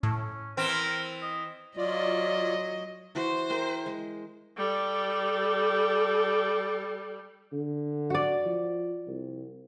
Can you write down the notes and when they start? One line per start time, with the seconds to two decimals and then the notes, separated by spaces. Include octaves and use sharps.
0.03 A2 C#4
0.57 E3 C4 A#4
1.22 D#5
1.77 F#3 F4 D5 D#5
3.15 E3 F#4 C5
3.50 G#4 A#4 G5
3.86 G#3
4.57 G3 A4
7.52 D3
8.10 F#4 D5
8.46 F3
9.07 C2